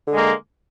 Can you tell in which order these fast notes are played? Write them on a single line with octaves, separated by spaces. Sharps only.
D3 G#3 A#3